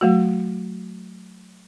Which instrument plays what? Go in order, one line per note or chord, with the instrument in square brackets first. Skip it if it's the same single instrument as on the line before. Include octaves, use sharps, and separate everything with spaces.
[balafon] F#3 A3 F#4